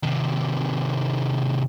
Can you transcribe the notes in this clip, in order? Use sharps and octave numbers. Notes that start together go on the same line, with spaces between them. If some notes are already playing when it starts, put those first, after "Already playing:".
C3 D#3